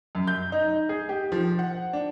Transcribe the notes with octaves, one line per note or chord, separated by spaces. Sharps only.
F#2
G6
D#4
G#4
G4
F3
F#5
D4